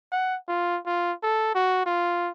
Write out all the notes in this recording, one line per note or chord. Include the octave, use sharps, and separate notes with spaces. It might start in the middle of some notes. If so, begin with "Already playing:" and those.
F#5
F4
F4
A4
F#4
F4